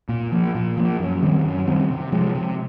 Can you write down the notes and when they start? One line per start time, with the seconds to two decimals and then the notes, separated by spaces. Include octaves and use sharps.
0.09 A#2
0.32 F3 A#3
0.55 A#2
0.77 F3 A#3
0.99 F#2
1.23 D#3 G3 C4
1.45 F#2
1.67 D#3 G3 C4
1.90 C3
2.12 F3 G#3
2.35 C3